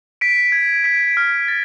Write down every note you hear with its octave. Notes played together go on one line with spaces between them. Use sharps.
B6 D7
G#6
B6 D7
F6
A6